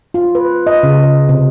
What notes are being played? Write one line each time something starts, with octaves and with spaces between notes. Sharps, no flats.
F4
B4
D#5
C#3
D#5
C3